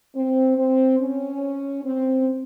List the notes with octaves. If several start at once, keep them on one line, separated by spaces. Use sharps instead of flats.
C4
C4
C#4
C4